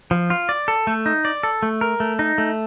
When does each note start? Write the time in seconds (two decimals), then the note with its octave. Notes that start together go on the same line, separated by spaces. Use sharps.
0.11 F3
0.30 F4
0.49 D5
0.68 A4
0.87 A3
1.06 D#4
1.25 D5
1.43 A4
1.63 A3
1.81 A#4
2.00 A3
2.19 D#4
2.38 A3